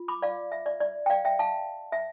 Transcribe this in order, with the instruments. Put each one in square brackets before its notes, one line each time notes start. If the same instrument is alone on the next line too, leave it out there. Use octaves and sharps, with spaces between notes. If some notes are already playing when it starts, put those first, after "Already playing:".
Already playing: [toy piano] F4
B5 D6
D5 F5
E5
D5
D5
G5
D5 F5
E5 G5
F5 A5
E5